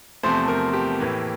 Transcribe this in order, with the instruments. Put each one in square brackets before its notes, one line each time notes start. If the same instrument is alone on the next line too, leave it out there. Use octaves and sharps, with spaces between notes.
[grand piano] E2 C3 F3 A3 C5
A#4
G4
A2 E3 A#3